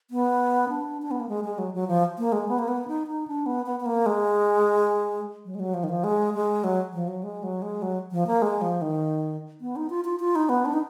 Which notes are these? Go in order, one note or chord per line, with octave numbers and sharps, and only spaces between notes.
B3
D4
D4
B3
A#3
G#3
G#3
F#3
F#3
F3
A#3
G#3
B3
A#3
B3
D#4
D#4
D4
B3
B3
B3
A#3
G#3
F#3
G#3
F#3
F3
D#3
F3
G#3
G#3
F#3
F3
F#3
G#3
F#3
G#3
F#3
F3
A#3
G#3
F3
D#3
B3
D#4
F4
F4
F4
D#4
B3
D4
D#4